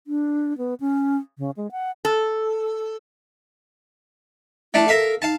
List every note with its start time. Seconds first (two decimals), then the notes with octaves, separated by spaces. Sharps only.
0.07 D4
0.58 B3
0.80 C#4
1.38 C#3
1.57 G#3
1.72 F#5
2.05 A4
4.74 A3 D4 E4 A5
4.88 A4 A#4 E5 F5
5.22 D#4 F5 A5